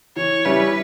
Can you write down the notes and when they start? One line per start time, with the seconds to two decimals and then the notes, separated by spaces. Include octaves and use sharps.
0.16 E3 C#5
0.45 G3 C#4 E4 B4